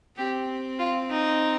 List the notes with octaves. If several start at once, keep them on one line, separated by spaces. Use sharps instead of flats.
C4 G4
F4
D#4